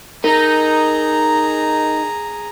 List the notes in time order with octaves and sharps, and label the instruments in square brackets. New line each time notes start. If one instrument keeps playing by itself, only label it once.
[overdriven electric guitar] D#4 [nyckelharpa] G#4 A#5 [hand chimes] A#4